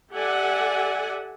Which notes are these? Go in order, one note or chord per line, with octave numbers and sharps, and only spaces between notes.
G4 A4 D5 E5 F#5 G#5